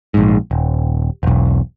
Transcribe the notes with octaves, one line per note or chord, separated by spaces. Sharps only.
A#1 G#2
D#1
E1 B1